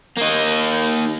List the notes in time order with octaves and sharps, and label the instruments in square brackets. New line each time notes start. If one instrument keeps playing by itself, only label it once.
[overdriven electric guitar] A#3 D#4